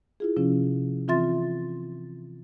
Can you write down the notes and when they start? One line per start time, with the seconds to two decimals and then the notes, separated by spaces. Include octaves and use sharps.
0.20 E4 F4 G#4
0.37 C3 F3 C#4
1.08 E3 C4 F4 E5 C6 A6